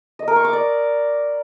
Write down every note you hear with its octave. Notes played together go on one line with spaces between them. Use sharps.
D#5
A#4
C#6
D6
D5